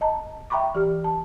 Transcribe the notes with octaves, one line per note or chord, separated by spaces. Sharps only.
D#5 A5 A#5
E5 G5 A#5 B5 C#6 D6
E3 G4 F6
A5